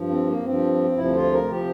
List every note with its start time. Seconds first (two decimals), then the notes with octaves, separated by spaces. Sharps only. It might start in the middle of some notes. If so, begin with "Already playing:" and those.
Already playing: G2 F3
0.09 C4
0.27 A#3
0.44 G2 F3 C4
0.97 D2 C3 F3 E4
1.16 F4
1.33 A#4
1.50 C3 F3 G4